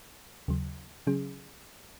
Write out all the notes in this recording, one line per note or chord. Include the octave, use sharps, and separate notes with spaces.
D#2 C#3 F#3
C#3 F#3 C#4 G#4